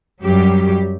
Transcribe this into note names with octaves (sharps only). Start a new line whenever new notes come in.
F#2 F#3 G3 G4